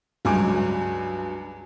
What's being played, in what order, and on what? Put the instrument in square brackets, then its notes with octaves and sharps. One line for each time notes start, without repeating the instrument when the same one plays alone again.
[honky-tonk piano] C#2 G2 F#3 G#3 G#5 D6